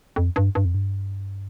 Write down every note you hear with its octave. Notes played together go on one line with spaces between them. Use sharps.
F2
G2
G2
F2
G2